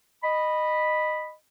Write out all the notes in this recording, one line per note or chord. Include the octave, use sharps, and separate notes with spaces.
D#5 B5